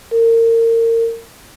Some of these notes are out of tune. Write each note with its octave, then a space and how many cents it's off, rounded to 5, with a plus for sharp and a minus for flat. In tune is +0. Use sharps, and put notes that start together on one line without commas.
A#4 -30